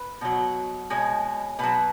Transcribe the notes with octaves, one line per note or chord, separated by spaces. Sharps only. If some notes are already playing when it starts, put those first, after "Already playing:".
Already playing: B4
B2 F#3
B2 G#3 C#5
B2 F#3 B4